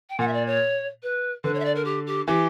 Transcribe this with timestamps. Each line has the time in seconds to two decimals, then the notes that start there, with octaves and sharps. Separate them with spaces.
0.10 G5
0.19 A#2 F#5
0.28 E5
0.33 D5
0.47 C#5
1.03 B4
1.44 D3 B4
1.54 C#5
1.60 E5
1.65 D5
1.75 A#4
1.85 G4
2.07 G4
2.27 E3 G4